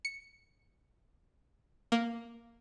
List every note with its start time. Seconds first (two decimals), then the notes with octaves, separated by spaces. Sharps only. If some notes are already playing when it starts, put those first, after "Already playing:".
0.05 C#7
1.92 A#3